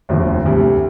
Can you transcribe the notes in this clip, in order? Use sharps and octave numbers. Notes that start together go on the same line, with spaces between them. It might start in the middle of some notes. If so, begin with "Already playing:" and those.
F1 D#2 D3 F3
D2 C3 G3